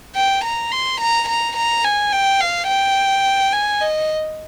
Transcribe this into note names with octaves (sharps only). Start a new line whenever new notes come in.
G5
A#5
C6
A#5
A#5
A#5
G#5
G5
F5
G5
G#5
D#5